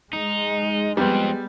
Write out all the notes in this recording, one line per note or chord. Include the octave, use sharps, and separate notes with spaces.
G#3 D#4
F2 G3 B3 C4